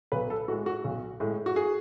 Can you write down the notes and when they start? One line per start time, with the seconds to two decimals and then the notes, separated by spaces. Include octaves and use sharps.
0.12 B1 B4
0.30 A4
0.48 A2 F#4
0.52 G#3
0.66 F#4
0.84 B1
1.20 A2 G#3
1.46 F#4
1.56 G#4